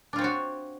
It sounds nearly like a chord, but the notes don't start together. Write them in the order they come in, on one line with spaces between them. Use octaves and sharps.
D4 F4 C4 C#5 F#4